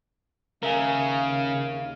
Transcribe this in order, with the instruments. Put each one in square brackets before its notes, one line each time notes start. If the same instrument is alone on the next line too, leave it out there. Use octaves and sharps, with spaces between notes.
[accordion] D#2 F5 [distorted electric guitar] C#3 [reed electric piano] A#4 E5 G#5